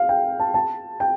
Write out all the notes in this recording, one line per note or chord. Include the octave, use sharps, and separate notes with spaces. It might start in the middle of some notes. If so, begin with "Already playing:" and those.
Already playing: F5
G5
A5
A5
G5